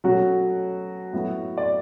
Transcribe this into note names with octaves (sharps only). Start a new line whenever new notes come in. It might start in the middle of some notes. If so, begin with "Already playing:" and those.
B2 F#3 A3 C#4 F#4
A2 F#3 B3
D5